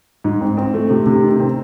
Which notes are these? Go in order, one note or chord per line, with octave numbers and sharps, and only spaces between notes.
G#2
C4
C4
A3
C3
C3
D#3
C4